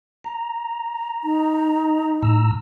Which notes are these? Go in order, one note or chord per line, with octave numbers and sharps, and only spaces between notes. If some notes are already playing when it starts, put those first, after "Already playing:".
A#5
D#4
A2 A#5 E6